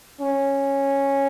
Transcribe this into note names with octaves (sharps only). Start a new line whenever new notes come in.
C#4